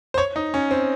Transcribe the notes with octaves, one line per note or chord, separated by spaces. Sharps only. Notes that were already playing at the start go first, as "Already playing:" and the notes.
C5
C#5
D#4
C#4
C4